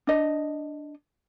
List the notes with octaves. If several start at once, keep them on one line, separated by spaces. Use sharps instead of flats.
D4 D#5